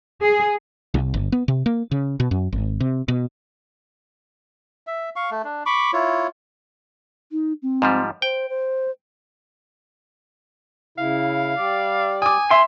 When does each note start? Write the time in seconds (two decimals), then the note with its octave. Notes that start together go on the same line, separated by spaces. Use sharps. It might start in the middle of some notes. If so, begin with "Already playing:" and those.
0.22 G#4
0.94 C2
1.14 G1
1.32 B3
1.48 C3
1.66 A#3
1.91 C#3
2.20 B2
2.31 F#2
2.52 G#1
2.80 C3
3.08 B2
4.87 E5
5.16 F5 C#6
5.31 A3
5.44 D4
5.66 B5 C#6 D6
5.93 E4 F4 C#5
7.32 D#4
7.62 C4
7.82 G#2 F3 G3
8.22 C5 G5
8.50 C5
10.98 C#3 E4 F5
11.56 G3 D5
12.22 G#5 D6 D#6
12.51 E5 C6